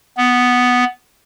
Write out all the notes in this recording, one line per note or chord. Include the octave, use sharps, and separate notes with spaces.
B3